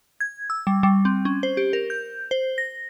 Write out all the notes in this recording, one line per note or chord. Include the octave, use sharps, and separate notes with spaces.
G#6
E6
G3
G3
C4
C#4
C5
G4
A#4
G6
C5
A#6